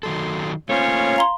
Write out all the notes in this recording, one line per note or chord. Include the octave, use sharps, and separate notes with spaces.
D#3 F#3 A4 C6
A3 A#3 C#4 F4 C5 C#5
F5 A#5 C6